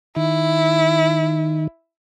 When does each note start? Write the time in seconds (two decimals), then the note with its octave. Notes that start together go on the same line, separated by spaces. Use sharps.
0.17 D#3 E4